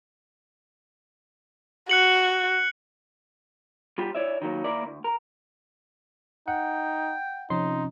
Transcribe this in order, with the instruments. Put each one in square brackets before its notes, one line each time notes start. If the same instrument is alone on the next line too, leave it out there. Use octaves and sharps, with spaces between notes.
[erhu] F#4 [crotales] F#6 C#7 F#7
[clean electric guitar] G3 F4 G4
E4 C#5 D5 E5
D#3 F#3 A#3
D#2 A#3 E4 A#4 D5
D2
A#4
[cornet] D#4 [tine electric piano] F#5 [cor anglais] G5
[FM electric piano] C3 F3 C#4 [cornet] D#4 [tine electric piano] C6